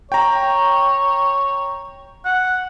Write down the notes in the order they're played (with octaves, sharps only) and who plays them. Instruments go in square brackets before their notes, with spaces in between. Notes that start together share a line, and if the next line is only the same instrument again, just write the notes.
[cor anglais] C#5 [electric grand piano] G5 A#5
[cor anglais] F#5